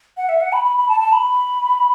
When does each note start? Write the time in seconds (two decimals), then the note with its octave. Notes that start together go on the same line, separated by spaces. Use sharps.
0.17 F#5
0.29 E5
0.41 F#5
0.53 B5
0.65 B5
0.77 B5
0.89 A5
1.00 A5
1.13 B5